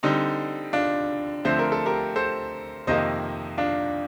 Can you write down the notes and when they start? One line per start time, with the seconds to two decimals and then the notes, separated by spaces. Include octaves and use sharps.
0.03 D3 G3 C4 D#4
0.73 D4 F4
1.45 D3 F3 A3 C4 C5
1.59 A#4
1.72 A4
1.86 G4 A#4
2.16 A4 C5
2.87 F2 C3 D#3 A#3 C5 D#5
3.58 D4 F4